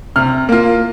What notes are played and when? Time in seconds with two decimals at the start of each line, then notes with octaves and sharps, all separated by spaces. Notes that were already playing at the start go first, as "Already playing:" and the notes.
0.16 C3 F6
0.49 A#3 F4